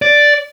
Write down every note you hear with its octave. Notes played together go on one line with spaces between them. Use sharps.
D5